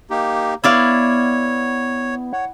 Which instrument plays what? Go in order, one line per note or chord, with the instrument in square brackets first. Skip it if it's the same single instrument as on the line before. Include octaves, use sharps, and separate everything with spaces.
[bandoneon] A#3 D#4 G4
[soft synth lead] B3 [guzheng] E4 D5 F5 [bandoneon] C#5
[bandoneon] C#5 [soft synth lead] F#5